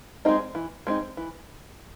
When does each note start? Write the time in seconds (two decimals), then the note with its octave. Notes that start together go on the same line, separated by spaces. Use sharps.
0.25 G#3 C4 D#4
0.55 E3
0.87 G#3 C4 D#4
1.17 E3